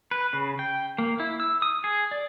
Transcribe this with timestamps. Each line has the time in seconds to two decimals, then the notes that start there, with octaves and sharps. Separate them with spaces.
0.11 B4
0.33 C#3
0.59 G5
0.98 A#3
1.20 E4
1.40 E6
1.62 D#6
1.84 G#4
2.11 D5